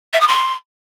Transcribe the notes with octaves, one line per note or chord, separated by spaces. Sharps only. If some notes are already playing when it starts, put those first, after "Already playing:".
E5
D#6
C6